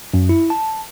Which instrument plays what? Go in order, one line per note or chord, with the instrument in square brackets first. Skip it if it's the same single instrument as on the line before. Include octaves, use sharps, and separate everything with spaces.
[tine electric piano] F#2
E4
A5